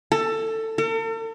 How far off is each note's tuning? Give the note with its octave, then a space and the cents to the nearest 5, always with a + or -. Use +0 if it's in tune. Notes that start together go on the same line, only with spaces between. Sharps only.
A4 +20
A4 +45